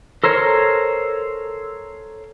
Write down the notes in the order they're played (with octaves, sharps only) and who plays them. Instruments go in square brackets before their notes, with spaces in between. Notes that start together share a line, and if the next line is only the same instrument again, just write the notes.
[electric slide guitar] A4 A#4 C5 C#5